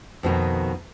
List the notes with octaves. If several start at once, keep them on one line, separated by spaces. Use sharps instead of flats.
F2 B2 D#3